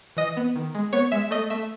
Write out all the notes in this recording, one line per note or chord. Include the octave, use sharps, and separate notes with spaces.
E3 D#5
B3
D#3
G#3
B3 C#5
G#3 E5
A3 D#5
A3 E5